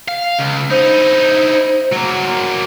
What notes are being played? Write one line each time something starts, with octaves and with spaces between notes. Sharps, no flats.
F5
C#2
D#4 E4 C5
F#3 A#3